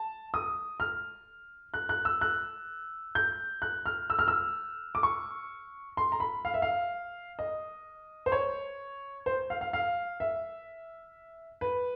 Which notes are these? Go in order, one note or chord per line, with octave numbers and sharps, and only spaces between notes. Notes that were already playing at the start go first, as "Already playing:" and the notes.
Already playing: A5
D#6
F6
F#6
F#6
E6
F#6
G6
F#6
F6
E6
F6
E6
D6
C#6
C6
A#5
B5
F5
E5
F5
D#5
C5
C#5
C5
F5
F5
F5
E5
B4